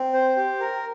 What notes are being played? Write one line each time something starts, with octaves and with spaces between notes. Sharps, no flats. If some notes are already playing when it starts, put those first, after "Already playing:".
Already playing: C4
C5
G4
A#4